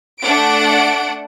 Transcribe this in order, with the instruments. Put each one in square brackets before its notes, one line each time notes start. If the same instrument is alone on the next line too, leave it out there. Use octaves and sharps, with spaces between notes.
[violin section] A3 D4 F#5 D7